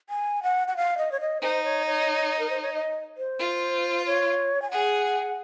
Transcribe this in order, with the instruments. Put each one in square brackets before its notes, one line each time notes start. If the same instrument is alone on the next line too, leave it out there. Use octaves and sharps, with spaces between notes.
[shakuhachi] G#5
F#5
F#5
F5
D#5
C#5
D#5
[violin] D#4 [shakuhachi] C5
[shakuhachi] C#5
C#5
A#4
C5
C#5
D#5
C5
[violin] F4
[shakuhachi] C#5
G#5
[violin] G#4 [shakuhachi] F#5